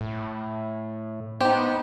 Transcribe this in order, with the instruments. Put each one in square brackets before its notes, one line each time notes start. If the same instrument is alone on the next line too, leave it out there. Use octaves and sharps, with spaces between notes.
[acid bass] A2
[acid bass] B3 [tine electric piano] D#4 C5 [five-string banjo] G4